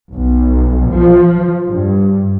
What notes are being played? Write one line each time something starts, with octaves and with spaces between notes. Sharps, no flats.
B1
F3
G2